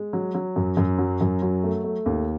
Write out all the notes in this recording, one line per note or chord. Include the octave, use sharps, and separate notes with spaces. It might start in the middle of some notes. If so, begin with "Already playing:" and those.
Already playing: G#3
F#3
F#3
F#2
F#2
F#3
F#2
F#3
A3
A3
D#2